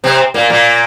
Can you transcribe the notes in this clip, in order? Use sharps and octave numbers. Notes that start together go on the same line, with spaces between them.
C3 C4
A#2 A#3
A#2 A#3